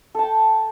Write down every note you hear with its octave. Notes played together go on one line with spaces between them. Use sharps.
A4 G5 A5